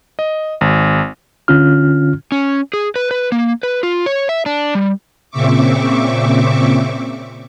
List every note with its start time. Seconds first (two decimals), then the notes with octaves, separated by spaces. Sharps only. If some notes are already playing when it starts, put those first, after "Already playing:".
0.19 D#5
0.61 G#1
1.48 D3 C#4 F4 F6
2.32 C#4
2.73 G#4
2.96 B4
3.11 B4
3.32 A#3
3.63 B4
3.83 F4
4.06 C#5
4.29 E5
4.46 D4
4.75 G3
5.31 A#2 C#3 C4 E5 C#6 D6